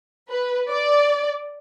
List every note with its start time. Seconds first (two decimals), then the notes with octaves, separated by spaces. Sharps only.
0.30 B4
0.70 D5